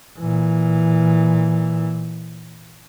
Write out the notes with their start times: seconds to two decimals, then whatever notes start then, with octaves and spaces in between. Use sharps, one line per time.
0.18 A#2 E3